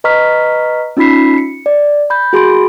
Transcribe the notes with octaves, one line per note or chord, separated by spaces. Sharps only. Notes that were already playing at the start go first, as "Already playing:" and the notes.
B4 D#5 A#5 C#6 F6 B6
C#4 D#4 F4 B5 B6 C7
C#7
D5
B5 G6
F#4 G#4 B5 C6 D7